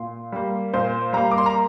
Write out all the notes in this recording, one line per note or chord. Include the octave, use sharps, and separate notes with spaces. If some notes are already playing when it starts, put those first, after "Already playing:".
Already playing: A#2 C6
G3 A#3
A#2 C5 C6
G3 A#3 A#5
D6
C6
A#5